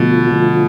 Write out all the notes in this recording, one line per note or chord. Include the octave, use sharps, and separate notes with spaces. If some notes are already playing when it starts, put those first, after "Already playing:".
Already playing: B2 D3 F3 A3 F4
D3 F3 A3 F4